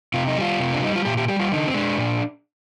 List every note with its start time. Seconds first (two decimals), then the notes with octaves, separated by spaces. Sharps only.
0.14 C3 F4
0.27 D#4
0.37 G3 F4
0.60 C3
0.73 D4
0.83 G3 D#4
0.96 F4
1.05 A#2 G4
1.17 G4
1.28 G3 G4
1.39 F4
1.52 D3 D#4
1.67 C4
1.74 G#3 D4
1.98 A#2